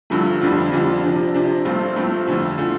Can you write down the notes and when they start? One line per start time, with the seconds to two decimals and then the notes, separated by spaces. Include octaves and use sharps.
0.10 G2 D3 F3 A3
0.41 F2 D3 G3 D4 F4
0.72 F2 D3 G3 D4 F4
1.03 C3 F3 D4
1.34 C3 F3 D4
1.65 G2 F3 A3 C4 F4
1.96 G2 F3 A3 C4 F4
2.27 F2 D3 A3 F4
2.58 D3 A3 F4